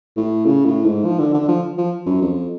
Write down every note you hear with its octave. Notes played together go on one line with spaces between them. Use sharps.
A2
C#3
A2
G#2
F3
D3
D3
F3
F3
F#2
F2